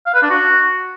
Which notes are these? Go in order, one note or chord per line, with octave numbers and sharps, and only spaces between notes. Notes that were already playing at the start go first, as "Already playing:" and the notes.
F5
B4
D4
F#4